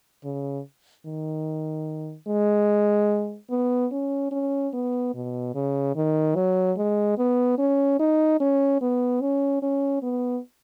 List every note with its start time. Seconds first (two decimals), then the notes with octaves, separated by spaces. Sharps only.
0.24 C#3
1.06 D#3
2.28 G#3
3.50 B3
3.92 C#4
4.31 C#4
4.73 B3
5.14 B2
5.55 C#3
5.96 D#3
6.35 F#3
6.77 G#3
7.18 B3
7.58 C#4
7.99 D#4
8.40 C#4
8.81 B3
9.21 C#4
9.62 C#4
10.03 B3